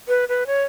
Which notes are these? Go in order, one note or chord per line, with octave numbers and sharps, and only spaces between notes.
B4
B4
C#5